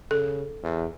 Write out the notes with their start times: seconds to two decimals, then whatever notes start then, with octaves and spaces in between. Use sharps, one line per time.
0.11 C#3 A4
0.63 E2